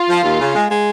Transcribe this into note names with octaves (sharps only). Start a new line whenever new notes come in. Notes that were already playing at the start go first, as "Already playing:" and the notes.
Already playing: F4
F3
D#2
C#3
G#3
G#3